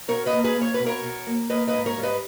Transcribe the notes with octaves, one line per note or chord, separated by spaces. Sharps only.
B2 A#4 C#5
B4 D#5
A#3
G#4 B4
A#3
C#5
B4
B2
A#4 C#5
B2
A#3
A#3 B4 D#5
B4 D#5
G#2
A#4 C#5
G3
B4 D#5